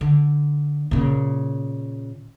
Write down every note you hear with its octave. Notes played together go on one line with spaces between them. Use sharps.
D3
A#2 C#3